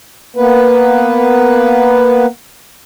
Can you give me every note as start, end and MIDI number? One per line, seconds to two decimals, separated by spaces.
0.36 2.26 58
0.36 2.26 59
0.36 2.26 71